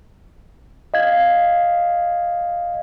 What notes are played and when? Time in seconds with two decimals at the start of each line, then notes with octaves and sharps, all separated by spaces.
0.94 D#5 F5 G#6